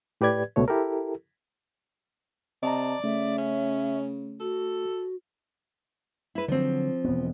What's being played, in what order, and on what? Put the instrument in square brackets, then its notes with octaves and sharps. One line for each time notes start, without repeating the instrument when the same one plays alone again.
[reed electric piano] A2 G4 B4 D5 G#6
C#2 B2 A3 C#5
E4 G4 A4 A#4
[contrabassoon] C3 [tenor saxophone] D5 [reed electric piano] D#5 A5 A#5
[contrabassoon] C#3 [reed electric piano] A3 [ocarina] E5
[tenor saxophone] C#4
[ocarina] F#4 [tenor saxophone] A4
[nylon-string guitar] E4 B4
[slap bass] D3 F#3 [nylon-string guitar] F3 C4
[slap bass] E1 B3